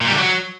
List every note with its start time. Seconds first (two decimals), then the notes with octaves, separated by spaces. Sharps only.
0.01 A#2
0.07 G3
0.12 D3
0.18 F#3